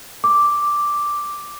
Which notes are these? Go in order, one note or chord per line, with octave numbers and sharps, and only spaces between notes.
D6